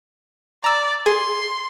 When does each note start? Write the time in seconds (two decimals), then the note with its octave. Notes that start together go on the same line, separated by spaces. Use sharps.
0.64 D5 A#5 E6
1.06 G#4 C6